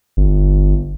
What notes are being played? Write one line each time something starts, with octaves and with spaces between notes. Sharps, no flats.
G1